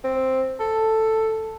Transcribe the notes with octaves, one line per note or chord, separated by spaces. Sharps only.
C4
A4